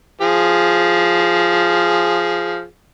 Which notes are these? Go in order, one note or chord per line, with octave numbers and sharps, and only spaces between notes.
F3 G#4